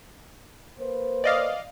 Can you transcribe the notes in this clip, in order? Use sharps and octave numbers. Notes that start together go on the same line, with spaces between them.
A#3 B4 C5
D5 D#5 F5